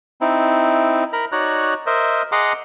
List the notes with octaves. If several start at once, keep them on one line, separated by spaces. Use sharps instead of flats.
C4 D#4 E4
A#4 A#5 B5
D#4 F#4 C#5 D5 A#5 F#6
A#4 C5 D#5 E5
G#4 D#5 F#5 A#5 C6 D6